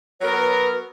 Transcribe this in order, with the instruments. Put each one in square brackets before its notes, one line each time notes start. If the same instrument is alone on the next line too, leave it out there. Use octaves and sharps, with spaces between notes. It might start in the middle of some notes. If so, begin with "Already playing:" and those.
[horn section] F#3 B3 F#4 A#4 [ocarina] C#5
[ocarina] B4